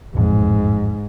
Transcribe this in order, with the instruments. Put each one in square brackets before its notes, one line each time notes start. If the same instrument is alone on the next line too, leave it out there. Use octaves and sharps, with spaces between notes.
[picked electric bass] E1 A1 F2 [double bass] G#2